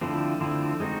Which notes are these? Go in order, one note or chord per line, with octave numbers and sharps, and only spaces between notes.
D3 F3 A3 C4 E4
D3 F3 A3 C4 E4
G#3 C4 D#4 F#4